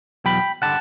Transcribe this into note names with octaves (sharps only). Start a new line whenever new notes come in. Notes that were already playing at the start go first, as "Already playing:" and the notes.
E2 B2 F#3 G5 B5
D3 G3 F#5 A5